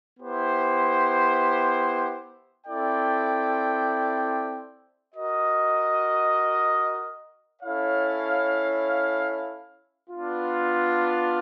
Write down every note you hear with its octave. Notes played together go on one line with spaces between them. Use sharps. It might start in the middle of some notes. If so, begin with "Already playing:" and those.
B3 E4 G4 C5
C4 E4 A4 D5 G5
F#4 A#4 D#5
C#4 E4 A4 C#5 F5
B3 D4 F4